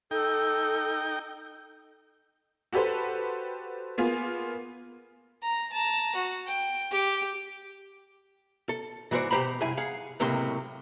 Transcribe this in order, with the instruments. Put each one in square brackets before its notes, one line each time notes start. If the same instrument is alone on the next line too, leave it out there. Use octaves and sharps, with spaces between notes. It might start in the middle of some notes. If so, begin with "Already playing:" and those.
[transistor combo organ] D#4 G5 [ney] A4
[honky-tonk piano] F#4 G4 A4 B4 C5
A#3 B3 F4 G#4
[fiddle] A#5
A5 A#5
F#4
G5
G4
[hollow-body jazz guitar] A4
G#2 E3 F#4 A#4 C5 D5
B2 G4 C5 A#5 B5
C2 F#2 E4 G#4 G#5
G#4 F5 F#5
C#2 A2 C3 F#3 A#3 C6